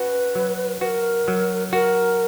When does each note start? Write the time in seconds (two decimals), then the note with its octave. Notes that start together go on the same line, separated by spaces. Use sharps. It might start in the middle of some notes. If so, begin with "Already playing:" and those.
Already playing: C#4 F#4 B4
0.35 F#3
0.81 F#4 A#4 B4
1.28 F#3
1.73 F#4 A#4